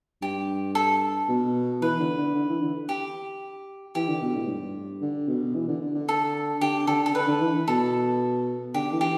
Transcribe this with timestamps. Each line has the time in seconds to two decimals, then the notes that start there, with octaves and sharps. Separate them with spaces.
0.22 G2 G4
0.75 A4
1.28 B2
1.81 E3 B4
2.00 D3
2.17 D3
2.35 D3
2.49 E3
2.62 D3
2.89 G4
3.95 E3 G4
4.08 D3
4.22 B2
4.35 A2
4.48 G2
5.02 D3
5.28 B2
5.55 E3
5.68 D3
5.81 D3
5.95 D3
6.09 A4
6.61 D3 G4
6.87 D3 A4
7.06 A4
7.14 D3 B4
7.28 D3
7.41 E3
7.68 B2 A4
8.74 D3 G4
8.93 E3
9.01 G4